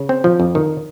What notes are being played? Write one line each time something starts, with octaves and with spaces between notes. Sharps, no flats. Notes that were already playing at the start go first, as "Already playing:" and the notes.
Already playing: C#3
C4
F3
F2
D#3